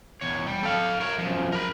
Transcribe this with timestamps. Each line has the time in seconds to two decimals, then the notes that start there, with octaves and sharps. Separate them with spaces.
0.21 E2 C#5
0.47 G3
0.63 A4 F5
1.00 A#4 C#5
1.18 F#2 F3
1.52 A#4 B5